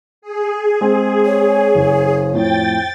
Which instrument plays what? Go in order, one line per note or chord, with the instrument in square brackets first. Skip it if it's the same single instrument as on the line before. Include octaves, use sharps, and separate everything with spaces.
[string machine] G#4
[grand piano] G#3 C4
[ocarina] C#5
[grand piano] F#1
[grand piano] F2 A2 [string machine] G5 A6